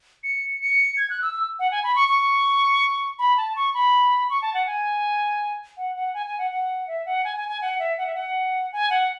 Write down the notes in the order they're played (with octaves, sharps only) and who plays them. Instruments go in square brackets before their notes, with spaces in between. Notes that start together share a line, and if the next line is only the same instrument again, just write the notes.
[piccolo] C#7
C#7
G#6
F#6
E6
E6
F#5
G#5
B5
C#6
C#6
B5
A5
C#6
B5
C#6
A5
F#5
G#5
F#5
F#5
G#5
G#5
F#5
F#5
E5
F#5
G#5
G#5
G#5
F#5
E5
F#5
E5
F#5
G#5
F#5